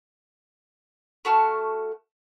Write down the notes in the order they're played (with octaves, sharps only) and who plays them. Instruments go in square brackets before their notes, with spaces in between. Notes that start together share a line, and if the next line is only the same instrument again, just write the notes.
[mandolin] A3 F#4 A5 F6